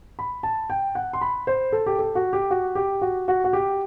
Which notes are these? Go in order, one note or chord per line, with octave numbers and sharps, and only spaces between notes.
B5
A5
G5
F#5
C6
B5
C5
A4
G4
A4
F#4
G4
F#4
G4
F#4
F#4
F#4
G4